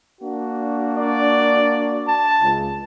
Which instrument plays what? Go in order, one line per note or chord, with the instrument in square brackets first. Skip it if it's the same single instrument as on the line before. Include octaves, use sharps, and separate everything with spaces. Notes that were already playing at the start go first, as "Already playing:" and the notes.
[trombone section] A#3 D4 F#4
[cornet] D5
A5
[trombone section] C#2